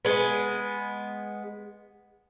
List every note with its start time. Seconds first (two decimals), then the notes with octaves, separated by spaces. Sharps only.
0.05 G#3 B3